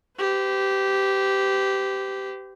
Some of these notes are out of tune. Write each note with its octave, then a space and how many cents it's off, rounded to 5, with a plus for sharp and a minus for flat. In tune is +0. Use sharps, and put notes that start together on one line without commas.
G4 -10 B4 +45